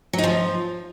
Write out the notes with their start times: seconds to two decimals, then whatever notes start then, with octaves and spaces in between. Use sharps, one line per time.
0.13 F#3
0.18 D#4
0.24 F3